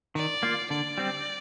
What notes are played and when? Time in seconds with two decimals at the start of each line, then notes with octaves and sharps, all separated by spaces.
0.15 D#3 D5
0.43 A#3 F4
0.70 D3 D5
0.98 G3 C4